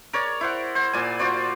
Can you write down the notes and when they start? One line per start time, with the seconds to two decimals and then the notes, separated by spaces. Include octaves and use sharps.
0.13 A#4 C#5 D5
0.41 E4 C5 F#5
0.75 C5 F#5
0.93 A#2 D5 G#5
1.19 F4 F#4 C5 D5